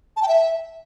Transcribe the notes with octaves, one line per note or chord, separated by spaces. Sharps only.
A5
G5
E5